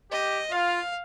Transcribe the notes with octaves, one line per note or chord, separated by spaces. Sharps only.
G4 D#5
F4 F5